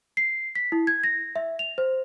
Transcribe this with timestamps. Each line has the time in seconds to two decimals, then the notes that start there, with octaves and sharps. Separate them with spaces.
0.17 C7
0.55 B6
0.72 E4
0.87 G#6
1.04 A#6
1.36 E5
1.59 F7
1.78 C5